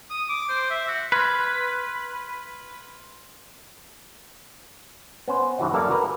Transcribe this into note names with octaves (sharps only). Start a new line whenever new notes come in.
D#6
D6
C5
E5
F#4
B4 C6 F6 G#6
B3 C#4 C5
G2 E3 F#4 D#5
F#2 A#3 A4 A#4 D5 F5
F#4 A#4 B4